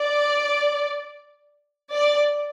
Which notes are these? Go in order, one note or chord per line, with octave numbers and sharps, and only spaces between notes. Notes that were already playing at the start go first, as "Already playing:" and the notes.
Already playing: D5
D5